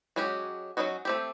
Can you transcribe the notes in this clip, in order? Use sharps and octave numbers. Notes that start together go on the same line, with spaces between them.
F#3 G#3 C#4 F#4 G4
F#3 A#3 C#4 D#4 F#4
A3 C4 G4